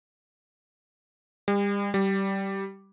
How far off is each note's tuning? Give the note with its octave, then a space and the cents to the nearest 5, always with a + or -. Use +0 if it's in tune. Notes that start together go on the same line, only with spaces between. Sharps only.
G3 +40
G3 -15